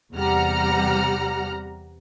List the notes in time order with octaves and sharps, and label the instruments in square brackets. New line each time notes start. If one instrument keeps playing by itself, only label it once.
[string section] E2 C3 G3 F#5 A#5 F6